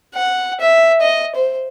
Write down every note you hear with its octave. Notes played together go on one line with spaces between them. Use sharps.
F#5
E5
D#5
C5